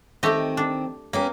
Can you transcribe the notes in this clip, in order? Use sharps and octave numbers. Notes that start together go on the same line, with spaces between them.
D#3 A3 C4 G4 D#5
D4
A#3 B3 C#4 G4